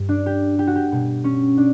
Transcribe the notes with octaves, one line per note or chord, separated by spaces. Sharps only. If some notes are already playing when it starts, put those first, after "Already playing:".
Already playing: G2 G3
D4
G4
G4
F#4
G4
B2 G3
C#4
D4